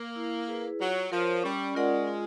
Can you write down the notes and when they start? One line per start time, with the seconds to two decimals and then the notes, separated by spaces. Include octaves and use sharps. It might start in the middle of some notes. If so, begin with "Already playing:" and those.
Already playing: A#3
0.16 E4
0.48 G#4 B4
0.80 F#3 F4
1.12 F3 A#4 C#5
1.43 G3 C#4
1.75 G#3 F4 A#4 D5 F#5
2.08 F4